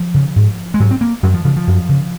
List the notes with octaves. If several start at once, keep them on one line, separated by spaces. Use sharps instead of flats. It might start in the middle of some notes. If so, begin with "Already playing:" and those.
Already playing: F3
C#3
G#2
G#3
G#2 F#3
C4
A#3
F#2 F#3
F3
C#3 F3
F3
F#2
C#3